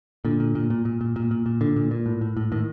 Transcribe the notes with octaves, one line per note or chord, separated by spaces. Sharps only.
A#2 D3
A#2
A#2
A#2
A#2
A#2
A#2
A#2
A#2
A#2 D3
A#2
A#2
A2
A2
A2
A2 D#3